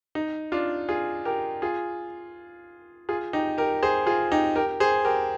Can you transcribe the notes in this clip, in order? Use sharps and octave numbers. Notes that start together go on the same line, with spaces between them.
D#4
D4 F4
F4 G#4
G4 A#4
F4 G#4
F4 G#4
D#4 G4
G4 A#4
G#4 C5
F4 G#4
D#4 G4
G4 A#4
G#4 C5
G4 A#4